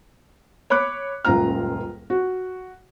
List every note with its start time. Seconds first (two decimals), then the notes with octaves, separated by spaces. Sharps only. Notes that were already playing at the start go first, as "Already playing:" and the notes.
0.70 C#5 B5 D6 F#6
1.25 D#1 C#2 F#2 F4 A#5 F6
2.10 F#4